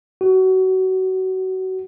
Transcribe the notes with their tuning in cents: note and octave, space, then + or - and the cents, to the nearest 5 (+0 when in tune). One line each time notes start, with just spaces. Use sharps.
F#4 +25